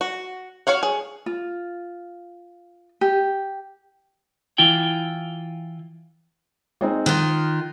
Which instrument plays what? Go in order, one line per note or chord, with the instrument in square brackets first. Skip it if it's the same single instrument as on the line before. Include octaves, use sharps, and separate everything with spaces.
[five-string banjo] F#4
F#4 C#5 F5 F#5
G#4
[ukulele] F4
G4
[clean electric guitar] E3 E4 F4 G5
[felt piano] G#3 C4 D#4
[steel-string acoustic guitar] D#3 F4 [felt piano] F#6